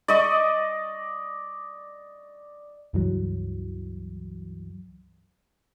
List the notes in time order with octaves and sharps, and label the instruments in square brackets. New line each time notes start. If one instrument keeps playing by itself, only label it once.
[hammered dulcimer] D5 D#5 C#6
[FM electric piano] C#2 G2 E3 F#3